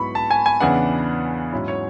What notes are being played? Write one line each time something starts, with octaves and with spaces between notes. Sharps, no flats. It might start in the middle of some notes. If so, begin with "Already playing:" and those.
Already playing: G#2 F#3 B3 E4 B5 C#6
A5
G#5
G#5
E2 C#3 E3 B3 D4 F#5
G#2 F#3 C#4 E4
C#5